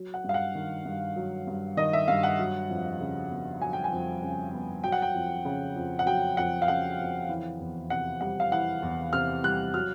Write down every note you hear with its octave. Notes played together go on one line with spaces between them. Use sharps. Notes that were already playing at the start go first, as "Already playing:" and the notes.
Already playing: F#3
F#5
G2 F5
F#5
D#3
G2
F#3
G2
D#3 D#5
E5
G2 F5
F#5
F#3
F2
C#3
B3
F#3 G#5
G5
G#5
F2
C#3
B3
F#3 G5
F#5
G5
F2
C#3
F2
F#5
F#3 G5
F2 F#5
F5
C#3 F#5
F2
E3
E2
C3 F#5
G3 F#5
F5
E3 F#5
E2
C3 F6
G3 F#6
F#3 F6